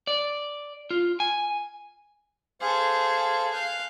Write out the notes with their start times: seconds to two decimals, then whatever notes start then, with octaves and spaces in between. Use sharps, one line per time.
0.07 D5
0.91 F4
1.20 G#5
2.61 G#4 A4 C5 F5
3.53 F5 F#6 G6